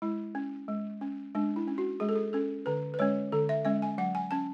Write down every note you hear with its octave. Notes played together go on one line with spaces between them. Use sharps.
G#3 E4
C#4
G#3
C#4
G#3 D4
E4
C#4
F#4
G#3 G#4
A4
G#4
C#4 A4
D3 B4
B4
G#3 C#4 C#5
D3 A4
E5
G#3 C#4 E5
G#5
F#3 F#5
G#5
C#4 A5